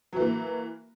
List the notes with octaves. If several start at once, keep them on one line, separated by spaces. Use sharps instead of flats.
E3 F#3 A#3